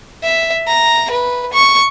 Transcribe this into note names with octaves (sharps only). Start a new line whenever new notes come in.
E5
A#5
B4
C#6